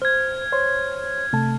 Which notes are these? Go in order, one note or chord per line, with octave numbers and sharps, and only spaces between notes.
C5 F6 G#6
C5 C#5 C6
C3 A3 A5